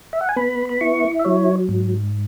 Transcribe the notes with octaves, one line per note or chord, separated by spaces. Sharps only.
E5
F#5
G#5
B3 B5
B5
E4 C#6
E5
F#3 C#5
G#2